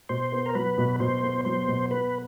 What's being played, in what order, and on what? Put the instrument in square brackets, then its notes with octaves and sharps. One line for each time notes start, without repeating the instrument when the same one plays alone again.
[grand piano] B2 [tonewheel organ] C5
[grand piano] B3
[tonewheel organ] A#4
[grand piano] F#3 [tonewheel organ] B4
[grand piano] B2
[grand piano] B2 [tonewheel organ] C5
[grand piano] B3
[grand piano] F#3 [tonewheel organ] C5
[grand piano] B2
[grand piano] B3 [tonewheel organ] B4